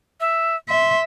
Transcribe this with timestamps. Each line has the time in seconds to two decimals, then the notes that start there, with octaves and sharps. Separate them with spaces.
0.20 E5
0.69 E5 C6